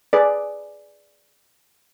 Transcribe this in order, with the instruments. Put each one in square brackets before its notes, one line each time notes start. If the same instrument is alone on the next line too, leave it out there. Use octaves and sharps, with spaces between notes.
[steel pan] G#4 B4 D5